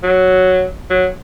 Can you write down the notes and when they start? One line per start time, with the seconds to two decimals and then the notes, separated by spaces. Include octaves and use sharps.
0.03 F#3
0.90 F#3